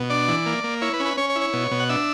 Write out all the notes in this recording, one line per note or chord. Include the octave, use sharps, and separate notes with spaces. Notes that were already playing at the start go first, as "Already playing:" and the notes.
Already playing: B2
D4 D5
E3
A#3
A#3
E4 C#5
B4
C#4
B4
C#4 C#5
C#5
E4
C#5
B2
B2
F#5
D4 E5